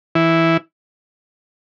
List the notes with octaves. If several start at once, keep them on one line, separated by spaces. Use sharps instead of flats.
E3 E4